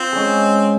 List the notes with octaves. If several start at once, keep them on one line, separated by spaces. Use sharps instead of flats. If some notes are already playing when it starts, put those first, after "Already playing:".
Already playing: C4 F4
G#3 C#4 G#4